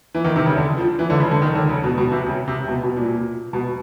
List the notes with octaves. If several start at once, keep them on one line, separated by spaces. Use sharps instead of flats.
E3
D#3
C3
C#3
D3
F3
E3
D3
C#3
D3
D#3
D3
C#3
B2
B2
C3
C#3
C3
B2
B2
A#2
B2